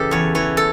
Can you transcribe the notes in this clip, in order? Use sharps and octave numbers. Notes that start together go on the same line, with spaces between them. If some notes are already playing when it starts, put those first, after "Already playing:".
Already playing: C#3 E3 G4 A4
E2 C#5
E3 C#5
A4